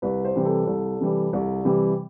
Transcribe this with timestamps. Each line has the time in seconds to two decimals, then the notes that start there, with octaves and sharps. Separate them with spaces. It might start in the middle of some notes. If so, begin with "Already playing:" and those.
0.02 C2 B4
0.25 C5
0.36 C3 E3 G3
0.45 A4
0.67 C2
1.00 C3 E3 G3
1.33 C2
1.65 C3 E3 G3